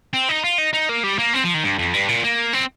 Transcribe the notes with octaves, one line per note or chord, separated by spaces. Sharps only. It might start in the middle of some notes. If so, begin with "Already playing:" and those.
C4
D#4
F4
D#4
D#4
A#3
G3
A#3
C4
F3
D#3
G2
F2
G2
A#2
A#3
C4